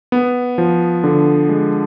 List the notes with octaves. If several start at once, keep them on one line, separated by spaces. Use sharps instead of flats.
B3
F3
D3
G#3